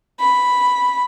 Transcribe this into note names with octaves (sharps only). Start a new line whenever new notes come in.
B5